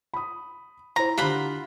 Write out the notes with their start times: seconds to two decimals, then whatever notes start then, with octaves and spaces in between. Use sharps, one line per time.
0.14 B5 D#6
0.96 E4 C5 A#5
1.18 D3 F4 G4 F#5 B5